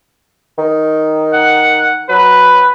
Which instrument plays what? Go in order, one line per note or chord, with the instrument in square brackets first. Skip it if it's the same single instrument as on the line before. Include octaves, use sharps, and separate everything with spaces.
[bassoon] D#3
[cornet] F#5
[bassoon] F#3 [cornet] B4